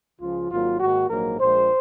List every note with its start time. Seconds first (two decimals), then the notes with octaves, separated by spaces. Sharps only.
0.20 C#2 C#3 F3 F4
0.50 G#1 G#2 F#3 A#3 F4
0.80 G#2 D#3 A#3 F#4
1.10 A#1 G#2 F#3 A#3 A#4
1.40 A#1 A#2 G#3 C5